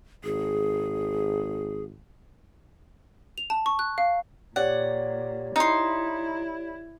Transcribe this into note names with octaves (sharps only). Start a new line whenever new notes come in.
G#1 G#4
F7
A5
C#6
F#6
F5
A#2 G4 C#5 D5 F#5
D#4 E4 C6